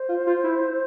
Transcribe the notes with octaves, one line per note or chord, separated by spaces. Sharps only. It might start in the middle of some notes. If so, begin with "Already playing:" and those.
Already playing: C5
F4
F4
E4